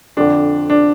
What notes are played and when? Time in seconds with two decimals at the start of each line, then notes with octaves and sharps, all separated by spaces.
0.17 F2 D3 D4
0.70 D4